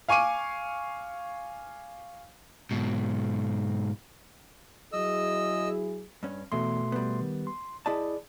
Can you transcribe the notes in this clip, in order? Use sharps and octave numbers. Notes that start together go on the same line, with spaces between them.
F5 G#5 C#6 D6 D#7
G#2 B2
F#3 E4 G#4 D#5 E6
G2 C#4
E2 B2 A3 C6
G3 B3
D#3
C6
E4 G#4 D5 D#5 A5